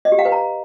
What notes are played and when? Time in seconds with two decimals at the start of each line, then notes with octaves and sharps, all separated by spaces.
0.05 D#5
0.12 G4
0.19 F5
0.25 B4
0.32 A#5